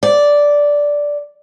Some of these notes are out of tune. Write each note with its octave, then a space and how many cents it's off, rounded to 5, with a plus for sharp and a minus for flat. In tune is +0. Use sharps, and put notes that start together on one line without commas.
D5 -5